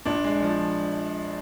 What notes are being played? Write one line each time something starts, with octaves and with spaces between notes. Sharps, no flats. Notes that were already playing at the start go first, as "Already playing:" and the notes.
A#1 D4
G#3
F3